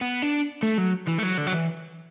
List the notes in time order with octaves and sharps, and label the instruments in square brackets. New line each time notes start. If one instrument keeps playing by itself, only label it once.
[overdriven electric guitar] B3
D4
A3
F#3
E3
A3
F#3
D3
F#3
E3